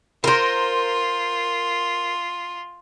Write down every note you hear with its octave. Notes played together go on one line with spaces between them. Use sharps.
F4 A#4 C5